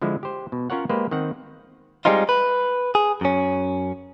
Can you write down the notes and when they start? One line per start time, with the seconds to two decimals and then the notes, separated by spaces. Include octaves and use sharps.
0.02 D3 F3 G#3 E4
0.23 G4 C5
0.52 B2
0.70 C#4 F4 A#4 C#5 F#5
0.89 G#3 A#3 G4 B4 C5
1.11 D#3 C4 F#5
2.05 G3 G#3 C4 D#4 F4
2.29 B4
2.95 G#4
3.21 F#2 C#4